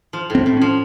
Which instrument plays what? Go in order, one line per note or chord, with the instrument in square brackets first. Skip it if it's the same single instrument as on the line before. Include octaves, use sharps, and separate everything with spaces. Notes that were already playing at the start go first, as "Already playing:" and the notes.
[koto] F3
A2
[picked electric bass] C4
[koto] A2
[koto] F3 [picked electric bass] C#4